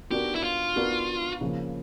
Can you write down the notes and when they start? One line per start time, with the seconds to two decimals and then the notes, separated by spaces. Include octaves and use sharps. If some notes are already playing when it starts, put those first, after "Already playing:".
0.11 B3 D4 F#4 G4 A#4
0.35 E4
0.44 F4
0.76 B3 D4 F#4 A#4
1.41 C#3 F3 A#3